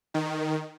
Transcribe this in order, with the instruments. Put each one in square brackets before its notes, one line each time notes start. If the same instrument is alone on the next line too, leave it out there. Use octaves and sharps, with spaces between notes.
[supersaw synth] D#3